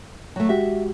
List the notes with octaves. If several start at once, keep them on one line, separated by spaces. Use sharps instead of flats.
F#3 A3
G#3 F#4 G4 E5